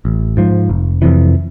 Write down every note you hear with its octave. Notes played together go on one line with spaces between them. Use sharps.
A1
G#2 F3
F1
F2 C3 E3